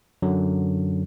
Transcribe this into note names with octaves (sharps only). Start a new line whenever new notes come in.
F#2 D3 F#3